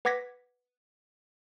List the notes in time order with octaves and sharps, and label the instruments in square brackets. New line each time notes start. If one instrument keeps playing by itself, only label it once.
[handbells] B4 F#5 D6 G#6 A#6 B6